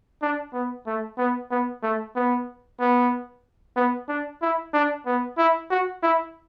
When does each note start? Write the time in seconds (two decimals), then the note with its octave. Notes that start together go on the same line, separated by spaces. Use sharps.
0.22 D4
0.53 B3
0.86 A3
1.18 B3
1.51 B3
1.83 A3
2.16 B3
2.80 B3
3.76 B3
4.09 D4
4.42 E4
4.74 D4
5.06 B3
5.38 E4
5.71 F#4
6.03 E4